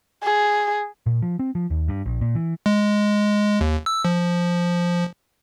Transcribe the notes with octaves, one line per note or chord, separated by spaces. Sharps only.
G#4
A#2
F3
C4
F3
D#2
G2
A#1
A#2
E3
G#3
D#2
E6
F3